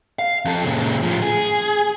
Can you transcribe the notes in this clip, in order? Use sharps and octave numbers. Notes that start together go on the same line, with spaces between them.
F5
F2 A4
A#2 C#3
A2 F3
G#4